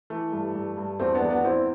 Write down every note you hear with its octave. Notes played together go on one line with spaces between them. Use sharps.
E3 A3
G2
G2
G2
E2 A3 C4
B3 D4
E2
B3 D4
E2 C4 E4